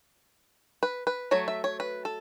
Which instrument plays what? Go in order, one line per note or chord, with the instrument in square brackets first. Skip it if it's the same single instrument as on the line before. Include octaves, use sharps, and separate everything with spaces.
[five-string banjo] B4
B4
F#3 A3 C#5
E5
C#5
B4
A4